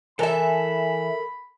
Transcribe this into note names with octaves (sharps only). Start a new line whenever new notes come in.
E3 A4 A#4 E5 A5 B5